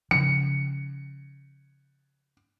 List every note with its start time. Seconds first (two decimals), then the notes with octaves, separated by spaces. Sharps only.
0.11 C#3 F3 C#7